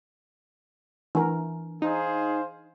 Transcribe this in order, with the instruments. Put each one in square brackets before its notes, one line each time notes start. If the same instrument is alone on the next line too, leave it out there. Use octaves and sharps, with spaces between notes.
[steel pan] E3 A#4 [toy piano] D4
[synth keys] D#4 [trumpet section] G#4 C5 F5